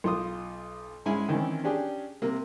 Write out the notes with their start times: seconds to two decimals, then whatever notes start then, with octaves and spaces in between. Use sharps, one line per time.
0.04 B1 F4 C6 D#6
1.06 G#2 G#3 C#4 E4 G#5
1.29 D#3 E3 C4 C#4
1.64 C#4 D4 G4 G#4
2.22 C3 A#3